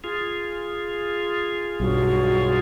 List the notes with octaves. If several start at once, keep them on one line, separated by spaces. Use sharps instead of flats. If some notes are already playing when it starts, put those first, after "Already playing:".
F4 G#4
B1 G2 F#3